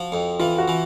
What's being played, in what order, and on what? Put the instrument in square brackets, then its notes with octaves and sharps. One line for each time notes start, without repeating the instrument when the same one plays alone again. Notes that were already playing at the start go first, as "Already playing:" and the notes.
Already playing: [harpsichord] F3 [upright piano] F#4
[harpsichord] F2
[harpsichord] E3 [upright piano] F4
[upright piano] F#4
[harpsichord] E3